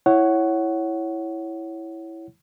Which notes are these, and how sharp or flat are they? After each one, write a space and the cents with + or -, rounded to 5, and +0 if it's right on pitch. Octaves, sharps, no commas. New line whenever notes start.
E4 +0 C#5 +0 F#5 +15